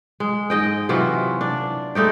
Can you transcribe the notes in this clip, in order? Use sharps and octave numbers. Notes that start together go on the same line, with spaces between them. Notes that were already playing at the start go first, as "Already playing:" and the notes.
G#3
G#2 D#5 G5
C3 E3 F#3 F4
D4
G#3 A3 D#4 G4